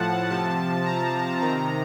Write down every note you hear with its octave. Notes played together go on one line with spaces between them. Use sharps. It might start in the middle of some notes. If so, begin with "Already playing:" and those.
Already playing: A2 F3 F#5 A5
C3 F3 A5
A#5
C3 D#3 A#5